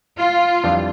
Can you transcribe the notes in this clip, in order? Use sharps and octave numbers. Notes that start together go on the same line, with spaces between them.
F4
F2 E3 G3 D4